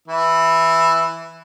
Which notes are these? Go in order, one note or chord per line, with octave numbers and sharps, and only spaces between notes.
E3 E4